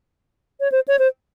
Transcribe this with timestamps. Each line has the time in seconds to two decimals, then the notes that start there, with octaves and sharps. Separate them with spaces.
0.60 C#5
0.72 C5
0.88 C#5
0.99 C5